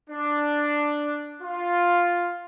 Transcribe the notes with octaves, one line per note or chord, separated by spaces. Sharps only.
D4
F4